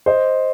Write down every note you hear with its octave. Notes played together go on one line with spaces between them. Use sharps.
C5 D#5